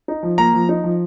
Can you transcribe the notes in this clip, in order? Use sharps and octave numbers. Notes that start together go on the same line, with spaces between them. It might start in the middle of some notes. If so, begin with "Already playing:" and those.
D#4
F3
A#3 A#5
F3
D#4
F3